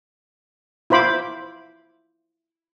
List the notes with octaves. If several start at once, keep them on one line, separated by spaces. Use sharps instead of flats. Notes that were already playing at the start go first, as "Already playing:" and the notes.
E4 F4 C5 B5 D6